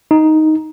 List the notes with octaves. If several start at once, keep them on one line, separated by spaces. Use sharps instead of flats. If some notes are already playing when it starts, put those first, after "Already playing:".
D#4